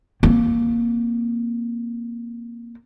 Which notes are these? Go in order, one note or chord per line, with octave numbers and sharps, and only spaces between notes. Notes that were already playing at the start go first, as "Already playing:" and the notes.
A#3 C4